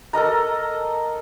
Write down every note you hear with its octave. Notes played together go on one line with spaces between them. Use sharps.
A4 A#4 D#5 A#5